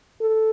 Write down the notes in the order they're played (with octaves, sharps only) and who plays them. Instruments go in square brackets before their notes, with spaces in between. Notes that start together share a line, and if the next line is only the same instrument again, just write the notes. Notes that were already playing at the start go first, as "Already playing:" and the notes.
[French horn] A4